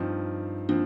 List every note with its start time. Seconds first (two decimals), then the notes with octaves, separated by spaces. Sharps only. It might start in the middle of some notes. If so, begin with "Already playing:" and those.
Already playing: G2 F3 C4 D#4
0.69 F3 A#3 C4 D4